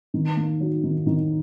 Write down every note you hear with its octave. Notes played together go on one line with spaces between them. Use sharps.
D#3
A#3
F#3
D#3
D#3